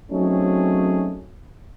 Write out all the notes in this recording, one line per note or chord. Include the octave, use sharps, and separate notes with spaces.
F#3 A3 C4 C#4 D#4 G#4